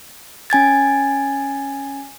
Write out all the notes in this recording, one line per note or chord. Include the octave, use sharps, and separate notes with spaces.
C#4 G#5 G#6 A6